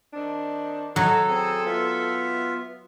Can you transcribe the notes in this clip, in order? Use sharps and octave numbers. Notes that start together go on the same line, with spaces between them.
D#3 C4 D4
F#3 A4 D#5 G#5
C4 G#4
B3 F4 E5